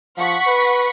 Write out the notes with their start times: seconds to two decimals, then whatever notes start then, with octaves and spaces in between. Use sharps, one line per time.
0.17 F3 F#5 C#6 B6
0.47 B4